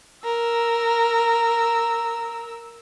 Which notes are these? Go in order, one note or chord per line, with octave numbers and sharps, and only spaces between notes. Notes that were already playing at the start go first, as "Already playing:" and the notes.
A#4 E6